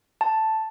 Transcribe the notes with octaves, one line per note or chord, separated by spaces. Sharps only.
A5